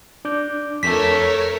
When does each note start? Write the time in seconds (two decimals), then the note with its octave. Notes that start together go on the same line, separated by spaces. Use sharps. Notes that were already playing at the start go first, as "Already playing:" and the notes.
0.25 D4 D6 G6
0.83 F2 A3 A#4 C#5 B6